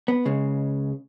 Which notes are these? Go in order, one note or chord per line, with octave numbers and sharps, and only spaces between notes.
B3
C#2 C#3 G#3